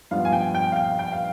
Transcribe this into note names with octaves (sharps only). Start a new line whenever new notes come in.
G2 F3 B3 F5
G#5
G5
G5
F5
G5
G5
F5